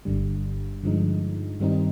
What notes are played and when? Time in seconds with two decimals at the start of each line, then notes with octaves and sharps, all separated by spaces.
0.05 G1 G2 D3 G3
0.83 G2 D3 F3 G#3 D#4
1.60 G2 D#3 G3 C4 D#4